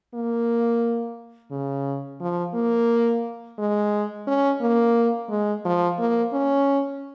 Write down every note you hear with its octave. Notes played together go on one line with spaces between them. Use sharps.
A#3
C#3
F3
A#3
G#3
C#4
A#3
G#3
F3
A#3
C#4